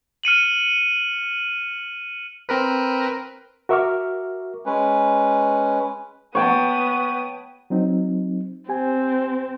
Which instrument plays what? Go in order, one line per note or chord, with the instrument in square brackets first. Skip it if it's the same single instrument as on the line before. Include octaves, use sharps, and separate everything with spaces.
[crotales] F6 C#7 D#7 F#7
[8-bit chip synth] C4 A#4 B4
[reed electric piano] F#4 A#4 E5 C#6 D6 F6
[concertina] G#3 C#4 B4
[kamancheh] B3 D#6 [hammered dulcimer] C#5 G5 A5
[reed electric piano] F#3 C4 D#4
[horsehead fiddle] C4 [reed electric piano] G4 G#5